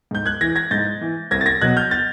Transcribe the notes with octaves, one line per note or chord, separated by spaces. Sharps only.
G#2 G6
F#6 G#6
E3 G#6 A#6
G#6 A#6
G#2 G6 A6
E3
C2 G#6 A#6
A6
G#6 A#6
B2 F#3 F#6 G#6
F6 G6
G6 A6